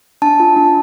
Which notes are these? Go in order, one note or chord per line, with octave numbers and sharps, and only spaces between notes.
D4 A5
F4
D4